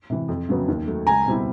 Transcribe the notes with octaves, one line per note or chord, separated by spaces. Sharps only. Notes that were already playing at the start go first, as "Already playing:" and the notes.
C3 E3
F2
C#3 F#3 B3
D#2
D#3 F#3 A3
C#2 G#5 A#5
B2 G3 C4 E4